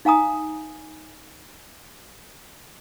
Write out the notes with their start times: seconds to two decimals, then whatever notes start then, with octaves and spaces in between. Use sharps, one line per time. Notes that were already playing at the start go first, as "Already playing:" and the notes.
0.05 D#4 F5 G#5 A#5 D#6